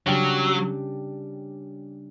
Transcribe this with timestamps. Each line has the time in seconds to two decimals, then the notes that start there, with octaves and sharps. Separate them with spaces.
0.06 C#3 F#3 G3 D4 G4